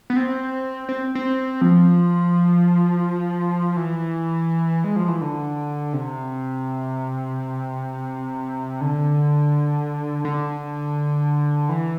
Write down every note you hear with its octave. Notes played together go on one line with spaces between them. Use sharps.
B3
C4
C4
C4
F3
E3
G#3
F3
E3
D3
C3
D3
D3
E3